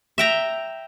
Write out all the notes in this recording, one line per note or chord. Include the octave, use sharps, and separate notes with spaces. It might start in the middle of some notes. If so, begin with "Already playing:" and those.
E5 G5 A#5